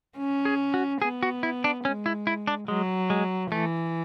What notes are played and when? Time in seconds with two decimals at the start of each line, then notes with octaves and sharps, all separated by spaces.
0.17 C#4
0.45 G#4
0.74 F#4
1.02 B3 G#4
1.23 F#4
1.43 E4
1.64 D4
1.85 G#3 C#4
2.06 E4
2.27 E4
2.47 D4
2.68 F#3 G#3
3.10 G#3
3.52 E3 A3